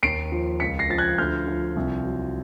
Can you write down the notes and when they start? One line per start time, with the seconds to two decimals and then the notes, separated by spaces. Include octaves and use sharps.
0.03 D#2 C7 D7
0.32 F3
0.60 C#2 B6 C#7
0.79 A#6 C7
0.90 F3 A6
0.98 F#6 G#6
1.18 D2 F6 G6
1.47 F3
1.76 C2
2.05 F#3